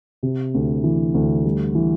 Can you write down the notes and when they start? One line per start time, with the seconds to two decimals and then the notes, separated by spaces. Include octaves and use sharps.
0.23 C3
0.54 D2
0.83 E3
1.14 D2
1.45 G3
1.75 E3